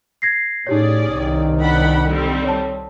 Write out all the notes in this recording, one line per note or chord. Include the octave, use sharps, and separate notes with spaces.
G#6 A#6 C7
A2 C#4 D#4 G4 G#4 C#5 D5
C2 D#3
D4 F#5 B5
D3 G3 C4
C#5 A5